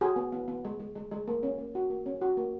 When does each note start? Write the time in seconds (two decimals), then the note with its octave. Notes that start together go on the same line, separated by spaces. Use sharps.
0.01 F#4 G#4
0.16 B3
0.32 B3
0.48 B3
0.65 G#3
0.80 G#3
0.95 G#3
1.11 G#3
1.28 A#3
1.43 C#4
1.58 A#3
1.75 F#4
1.90 A#3
2.06 C#4
2.21 F#4
2.37 A#3